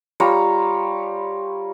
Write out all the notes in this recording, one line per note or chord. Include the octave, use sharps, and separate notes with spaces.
G3 F4 C#5 A#5